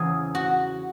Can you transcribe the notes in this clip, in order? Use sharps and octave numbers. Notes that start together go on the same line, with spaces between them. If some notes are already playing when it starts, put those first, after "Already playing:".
Already playing: E2 C#3 E3 G#4
F#4